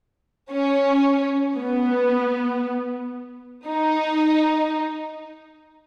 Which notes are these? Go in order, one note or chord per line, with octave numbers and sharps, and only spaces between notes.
C#4
B3
D#4